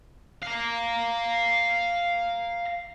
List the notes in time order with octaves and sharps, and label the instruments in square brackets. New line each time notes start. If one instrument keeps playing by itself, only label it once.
[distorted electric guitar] F5 A#5